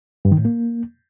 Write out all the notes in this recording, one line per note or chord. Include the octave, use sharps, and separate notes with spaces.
G2
D#3
A2
A#3